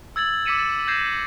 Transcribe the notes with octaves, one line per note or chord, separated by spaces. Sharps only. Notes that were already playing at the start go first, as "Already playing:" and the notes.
E6 G#6 A6 F#7
D6 E6 B6 C#7 D#7 E7
A6
G6 G#6 A#6 C7 E7